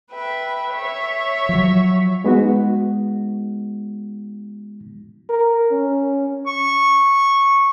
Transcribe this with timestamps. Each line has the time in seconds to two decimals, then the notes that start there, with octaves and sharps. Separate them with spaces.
0.11 B4 E5 G5
0.73 C#5 E5
1.49 F3 F#3
2.24 G#3 B3 D#4 F#4
5.29 A#4
5.71 C#4
6.47 C#6